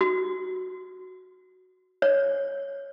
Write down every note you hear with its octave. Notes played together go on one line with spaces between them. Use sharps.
F#4
C#5